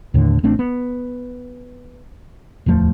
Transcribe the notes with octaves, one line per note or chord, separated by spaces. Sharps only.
D#2 A2 D3
A1 A3 C4 D4
B3
D1 E2 F3 A3